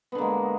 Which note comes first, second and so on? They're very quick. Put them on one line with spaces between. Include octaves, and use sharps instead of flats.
B3 D3 A#3 G#3